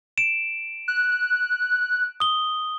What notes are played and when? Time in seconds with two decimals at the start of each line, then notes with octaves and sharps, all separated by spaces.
0.18 D7 E7
0.88 F#6
2.20 D#6 G7